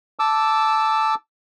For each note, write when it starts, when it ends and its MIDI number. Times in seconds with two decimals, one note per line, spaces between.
0.19 1.14 81
0.19 1.14 86
0.19 1.14 88